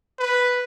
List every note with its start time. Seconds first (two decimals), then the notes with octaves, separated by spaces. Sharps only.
0.19 B4